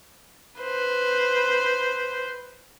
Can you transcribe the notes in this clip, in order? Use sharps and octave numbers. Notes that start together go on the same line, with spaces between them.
B4 C5